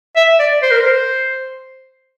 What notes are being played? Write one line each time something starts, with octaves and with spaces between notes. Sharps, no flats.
E5
D5
C5
A#4
C5